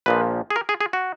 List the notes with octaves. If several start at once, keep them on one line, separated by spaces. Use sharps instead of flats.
A#1 A#2 F3 B4
G#4
A#4
G#4
G#4
F#4